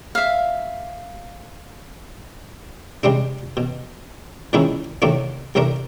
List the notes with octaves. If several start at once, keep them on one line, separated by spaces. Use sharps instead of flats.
E5 F5
C3 G3 G#3 D4
B2
A#2 D#3 G#3 C#4 D#4 E4
A2 C3 D#3 A3 A#3 D4
C2 C3 A3 D4 A#4